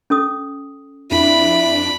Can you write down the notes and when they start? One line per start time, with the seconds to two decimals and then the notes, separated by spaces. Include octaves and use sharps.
0.10 C#4 A4 D#6
1.11 F2 D4 E4 B5 D7